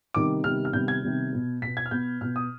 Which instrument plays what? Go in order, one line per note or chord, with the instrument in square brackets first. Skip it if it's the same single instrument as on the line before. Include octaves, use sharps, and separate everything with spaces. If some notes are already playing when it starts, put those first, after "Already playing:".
[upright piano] C3 D#3 G3 B3 D6
C3 D#3 G3 B3 F6
F6
C3 D#3 G3 B3 G6
G#6
C3 D#3 G3 B3
B2 B3
B2 B3 B6
G#6
F6
B2 B3 G6
B2 B3 F6
D#6